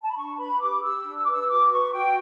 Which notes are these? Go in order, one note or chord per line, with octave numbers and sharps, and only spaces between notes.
A5
B5
D4 C#6
B4 B5
G4 D6
G4 E6
D4
E6
D6
B4 E6
F#4 D6
B4 C#6
F#4 G5